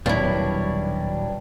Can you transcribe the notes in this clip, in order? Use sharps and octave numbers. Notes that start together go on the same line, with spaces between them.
D#1 B2 F#3 G3 D4 E4 F4 C#5